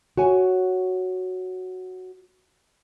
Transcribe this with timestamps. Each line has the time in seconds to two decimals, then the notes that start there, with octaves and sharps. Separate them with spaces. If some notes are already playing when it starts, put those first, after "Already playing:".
0.17 F#4 C#5 G#5